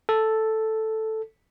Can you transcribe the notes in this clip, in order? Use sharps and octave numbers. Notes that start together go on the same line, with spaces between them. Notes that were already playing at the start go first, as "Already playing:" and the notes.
A4